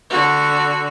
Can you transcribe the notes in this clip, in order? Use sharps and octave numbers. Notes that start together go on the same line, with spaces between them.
D3 F#4